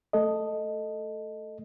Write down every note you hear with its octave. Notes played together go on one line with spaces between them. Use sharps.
A3 A4 D#5